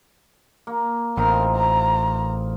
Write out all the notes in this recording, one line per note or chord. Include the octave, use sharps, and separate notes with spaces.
A#3
A1 C4 D#4 F4 A#4
A#5